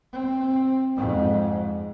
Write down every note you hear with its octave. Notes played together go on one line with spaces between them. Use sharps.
C4
F2 G#2